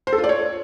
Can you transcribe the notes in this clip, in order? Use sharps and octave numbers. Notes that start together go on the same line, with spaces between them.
C5
A4
F4
D5
C#5